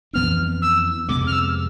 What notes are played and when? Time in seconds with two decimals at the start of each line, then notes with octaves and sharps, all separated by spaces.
0.13 F2 E3 B3 D4 F6
0.61 E6
1.08 F2 C3 G#3 B3 D6
1.26 F6
1.32 E6